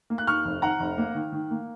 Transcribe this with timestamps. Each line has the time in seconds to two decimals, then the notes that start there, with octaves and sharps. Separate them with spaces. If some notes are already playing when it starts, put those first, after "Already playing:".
0.10 A#3
0.18 F#6
0.27 D#2 C#6 F6
0.45 F1
0.62 D#3 F#5 A#5
0.80 F1
0.98 A#3
1.15 D#3
1.32 D#3
1.51 A#3